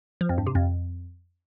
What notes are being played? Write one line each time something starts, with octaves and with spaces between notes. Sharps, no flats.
F3
F2
G2
C3
F2